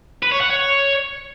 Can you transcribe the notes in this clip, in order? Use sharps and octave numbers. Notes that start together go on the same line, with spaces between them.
B4
C#5
F#5
C#5